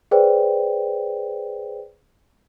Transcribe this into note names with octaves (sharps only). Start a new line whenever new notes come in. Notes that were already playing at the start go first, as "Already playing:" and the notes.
G#4 B4 C5 D5 G5